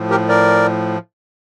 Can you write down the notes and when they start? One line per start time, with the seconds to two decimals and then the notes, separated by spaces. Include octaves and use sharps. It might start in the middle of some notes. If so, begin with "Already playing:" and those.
Already playing: A2 F3
0.10 G4 A#4
0.29 A#4 D5